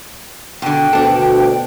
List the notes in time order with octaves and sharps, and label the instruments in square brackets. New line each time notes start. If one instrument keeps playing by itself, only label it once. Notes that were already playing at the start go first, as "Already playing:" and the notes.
[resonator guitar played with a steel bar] B2 D3 [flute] G5
[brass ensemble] D2 B2 [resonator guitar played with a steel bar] D4 A4